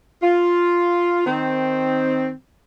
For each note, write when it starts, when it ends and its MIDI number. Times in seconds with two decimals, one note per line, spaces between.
0.22 1.26 65
1.26 2.31 51
1.26 2.31 60